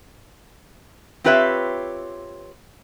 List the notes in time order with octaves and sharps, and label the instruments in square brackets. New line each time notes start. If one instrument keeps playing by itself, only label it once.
[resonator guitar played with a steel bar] C4 F4 G4 B4 C#5 E5